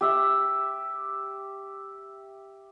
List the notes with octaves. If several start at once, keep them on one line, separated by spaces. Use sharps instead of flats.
G4 E5